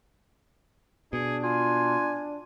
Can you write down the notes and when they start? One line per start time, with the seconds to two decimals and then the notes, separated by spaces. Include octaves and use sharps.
1.13 B2 D4 G#4
1.43 F4 G#5